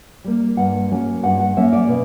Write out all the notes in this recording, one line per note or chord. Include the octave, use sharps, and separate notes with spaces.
G3 A#3
G2 F#5
F#3 A#3 C#4
G2 F#5
F#5
F#3 A#3 C#4 E5
D5
B2